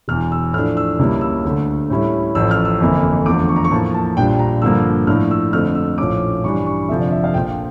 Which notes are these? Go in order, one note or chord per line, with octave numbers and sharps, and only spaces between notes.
E1 E2 E3 F6
E6
A2 F3 A3 D4 F6
E6
C#2 C#3 G3 A#3 E4
E6
D2 D3 A3
A2 G3 C#4 E4
A1 A2 F3 E6
F6
E6
G1 F2 E3 A#3 E4
E2 D3 F3 A3 D6
C#6
A#5
C#6
A2 F3 A#3 A5
A5
A#1 A#2 G3 D4 G5
A#5
G2 D3 F3 A#3 E6
A2 F3 A3 D4 F6
E6
F2 D3 A3 F6
E6
A#1 A2 F3 C#4 D6
G2 E3 G3 D4 C#6
C#6
F1 F2 D3 F3 E5
D5
E5
F5
A#1 A#2 F3 G5